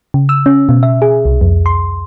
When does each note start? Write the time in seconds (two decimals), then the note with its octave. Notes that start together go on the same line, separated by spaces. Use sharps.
0.14 C#3
0.29 E6
0.46 C#4
0.69 B2
0.83 E5
1.02 G#4
1.25 C2
1.41 F2
1.66 C6